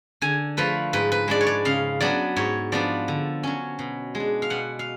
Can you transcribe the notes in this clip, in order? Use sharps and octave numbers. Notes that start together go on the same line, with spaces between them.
D3 G#5
F3 A3 B4
G#2 B4
B4
G#3 D4 D5
C#5
D5
C#3 F5
F#3 B3 D4 D5
G#2 C#5
F3 B3 D4 D5
D3
F#3 C#4
B2
G#3
D4
F5
B2 F#5
F5